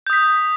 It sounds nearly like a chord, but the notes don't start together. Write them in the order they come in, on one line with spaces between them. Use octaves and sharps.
G6 D#6 B6